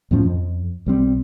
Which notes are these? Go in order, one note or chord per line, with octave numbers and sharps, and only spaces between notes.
E2 A2 F3 C#4
F2
B1 G3 C4